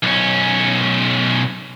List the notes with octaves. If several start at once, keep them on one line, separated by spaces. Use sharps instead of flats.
B1 C#4